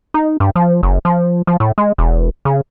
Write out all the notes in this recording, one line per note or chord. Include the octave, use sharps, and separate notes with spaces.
D#4
G2
F3
F#1
F3
F3
A2
G#3
E1
C#3